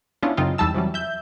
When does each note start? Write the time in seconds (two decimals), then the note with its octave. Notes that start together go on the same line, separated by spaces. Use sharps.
0.23 B3 C#4 D4 E4 F4
0.37 F#2 C#3 C4 D#4 F4
0.58 E2 G3 D#4 A5 E6
0.74 C3 E3 F#3 G3
0.94 E5 G6